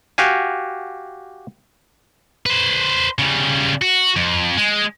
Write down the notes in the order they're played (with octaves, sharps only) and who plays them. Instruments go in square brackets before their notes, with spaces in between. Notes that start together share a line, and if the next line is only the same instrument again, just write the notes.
[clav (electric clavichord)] F#4 G4 F5 G#5
[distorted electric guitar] B4 C5
C#3 G3
F#4
F2
G#3